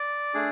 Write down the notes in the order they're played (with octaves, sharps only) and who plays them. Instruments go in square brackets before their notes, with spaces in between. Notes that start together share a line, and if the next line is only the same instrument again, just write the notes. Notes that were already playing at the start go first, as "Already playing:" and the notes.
Already playing: [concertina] D5
A3 D4 G#4